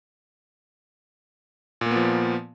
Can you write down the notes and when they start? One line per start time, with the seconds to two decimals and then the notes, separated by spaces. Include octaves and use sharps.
1.81 A#2
1.86 A#3
1.91 B3
1.96 F3